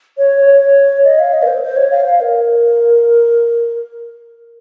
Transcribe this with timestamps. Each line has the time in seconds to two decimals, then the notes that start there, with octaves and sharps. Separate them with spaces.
0.18 C#5
0.46 C#5
1.04 D#5
1.19 F5
1.34 D#5
1.42 A#4
1.47 C5
1.63 C5
1.76 C#5
1.91 F5
2.06 F5
2.21 A#4